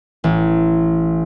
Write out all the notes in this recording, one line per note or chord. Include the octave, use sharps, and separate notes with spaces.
A1